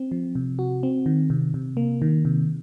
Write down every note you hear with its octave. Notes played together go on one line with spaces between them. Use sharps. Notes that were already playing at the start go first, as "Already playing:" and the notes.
Already playing: C4
F3
C3
F#4
C4
D#3
C3
C3
A#3
D#3
C3